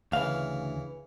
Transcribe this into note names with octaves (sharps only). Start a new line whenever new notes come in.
D2 C#3 E3 F5